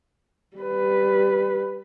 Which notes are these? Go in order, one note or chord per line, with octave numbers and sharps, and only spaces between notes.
G3 B4